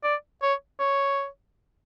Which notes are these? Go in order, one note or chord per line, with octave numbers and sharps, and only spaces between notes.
D5
C#5
C#5